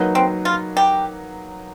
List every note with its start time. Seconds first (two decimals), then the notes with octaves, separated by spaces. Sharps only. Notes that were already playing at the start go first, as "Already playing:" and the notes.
Already playing: F#3 A#3 D#4 F#4 B4
0.15 C4
0.45 F4
0.77 G4